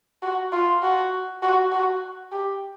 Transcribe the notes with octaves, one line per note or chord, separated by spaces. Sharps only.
F#4
F4
F#4
F#4
F#4
G4